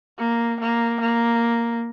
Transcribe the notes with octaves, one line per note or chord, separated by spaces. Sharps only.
A#3
A#3
A#3